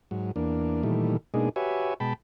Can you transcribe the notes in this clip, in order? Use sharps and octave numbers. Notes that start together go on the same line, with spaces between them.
G#2 F#3
E2 A#3 D4
A#2 D#3 E3 G3 A3
B2 G#3 A#3 D4 D#4 G#4
F#4 G4 B4 C#5 E5 G#5
B2 G#3 G5 A5 B5